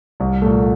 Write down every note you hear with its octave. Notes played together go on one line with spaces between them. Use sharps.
C2
A#2 A3